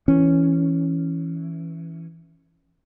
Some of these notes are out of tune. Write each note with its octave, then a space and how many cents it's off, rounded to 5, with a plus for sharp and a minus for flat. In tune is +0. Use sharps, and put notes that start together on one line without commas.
E3 +0 C#4 +0